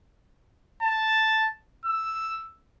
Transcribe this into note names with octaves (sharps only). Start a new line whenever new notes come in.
A5
E6